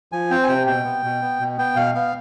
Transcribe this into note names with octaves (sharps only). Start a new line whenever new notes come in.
F3 G#5
C4 G5
G#5
C3 G5
B2 G5
B3
B2
B3
B2
B3 G5
B2 F5
B3 F5